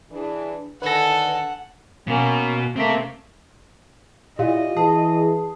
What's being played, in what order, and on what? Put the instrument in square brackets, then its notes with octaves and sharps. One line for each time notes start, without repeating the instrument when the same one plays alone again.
[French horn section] E3 D4 G#4
[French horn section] D3 D#3 [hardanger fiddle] A4 G#5 [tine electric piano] B4 A#6 [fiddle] F#5
[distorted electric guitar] B2 [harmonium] A#3 C#4
[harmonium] A3 A#3 [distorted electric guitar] C4 E5
[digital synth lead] A#2 [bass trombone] E4 [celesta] G4 F5 [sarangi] D#5
[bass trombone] E3 [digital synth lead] G#4 [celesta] A5